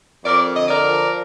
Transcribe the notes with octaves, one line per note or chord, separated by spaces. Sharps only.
F2 A#4 D5
D3 D#5
A#4 D5
F3